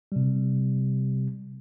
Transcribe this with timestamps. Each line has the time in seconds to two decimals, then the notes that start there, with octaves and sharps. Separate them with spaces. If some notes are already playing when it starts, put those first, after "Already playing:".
0.12 C3 G3